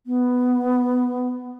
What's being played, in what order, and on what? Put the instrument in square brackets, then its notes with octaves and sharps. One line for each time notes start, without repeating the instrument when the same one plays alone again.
[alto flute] B3